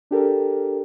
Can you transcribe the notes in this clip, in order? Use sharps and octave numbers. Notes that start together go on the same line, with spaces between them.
D4 G4 A4 A#4